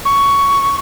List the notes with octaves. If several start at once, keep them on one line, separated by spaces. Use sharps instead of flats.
C#6